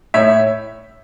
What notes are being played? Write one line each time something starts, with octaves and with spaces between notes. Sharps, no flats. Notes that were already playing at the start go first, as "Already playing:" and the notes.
A2 C#5 E5